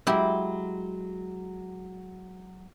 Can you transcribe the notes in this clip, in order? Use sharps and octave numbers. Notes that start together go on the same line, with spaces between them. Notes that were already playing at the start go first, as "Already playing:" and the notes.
F#3 G#3 E4 G4